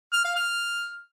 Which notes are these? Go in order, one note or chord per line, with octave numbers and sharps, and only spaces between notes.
F6
F5
F6